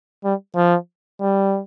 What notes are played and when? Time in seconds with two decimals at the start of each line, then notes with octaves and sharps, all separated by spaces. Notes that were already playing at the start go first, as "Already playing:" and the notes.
0.24 G3
0.56 F3
1.21 G3